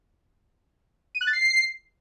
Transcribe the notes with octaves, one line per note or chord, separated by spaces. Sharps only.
D#7
F#6
A6
C7